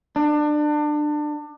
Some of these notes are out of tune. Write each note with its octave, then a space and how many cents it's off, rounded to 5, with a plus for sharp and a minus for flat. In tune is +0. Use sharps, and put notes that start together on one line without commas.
D4 +25